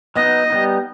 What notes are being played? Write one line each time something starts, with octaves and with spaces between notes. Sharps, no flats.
F#3 B3 D#4 D#5
G3 B3 D#4